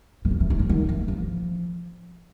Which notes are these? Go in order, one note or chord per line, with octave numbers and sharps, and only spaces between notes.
E3
D#3
E3
D#3
D3
D#3
E3
F3